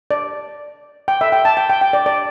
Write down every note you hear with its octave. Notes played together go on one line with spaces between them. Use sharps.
D5
G5
E5
G5
A5
G5
G5
G5
D5
D5